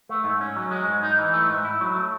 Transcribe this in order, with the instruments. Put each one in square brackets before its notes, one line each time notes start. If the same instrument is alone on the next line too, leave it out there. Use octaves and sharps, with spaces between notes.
[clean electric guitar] A3
G#2
C#4
F#3
G#3
G#2
D#4
E3
A3
G#2
E4
F#3
A3